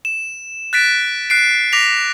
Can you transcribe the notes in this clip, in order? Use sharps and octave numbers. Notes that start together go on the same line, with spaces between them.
E7
F#6 A6 B6 D7
F#6 C7 D7
D6 A#6 B6 F7